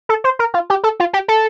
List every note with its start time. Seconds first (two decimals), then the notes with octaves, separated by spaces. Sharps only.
0.09 A4
0.24 C5
0.39 A#4
0.54 F4
0.70 G4
0.84 A4
1.00 F4
1.13 G4
1.28 A4